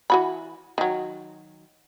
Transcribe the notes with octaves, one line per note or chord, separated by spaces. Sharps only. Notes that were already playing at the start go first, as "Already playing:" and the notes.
E3 F#4 B5
D#3 F#3